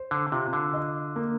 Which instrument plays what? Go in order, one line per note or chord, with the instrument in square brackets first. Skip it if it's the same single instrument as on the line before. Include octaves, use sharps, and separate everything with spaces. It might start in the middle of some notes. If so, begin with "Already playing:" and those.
Already playing: [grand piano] C5
[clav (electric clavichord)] D3
[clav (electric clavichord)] C3 [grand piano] F4
[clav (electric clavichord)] D3
[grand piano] D#5
A#3